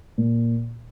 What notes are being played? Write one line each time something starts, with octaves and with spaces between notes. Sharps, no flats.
A#2